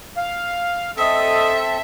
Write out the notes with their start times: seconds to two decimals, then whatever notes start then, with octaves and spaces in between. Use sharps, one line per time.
0.17 F5
0.97 C4 A4 D#5 E5 D#6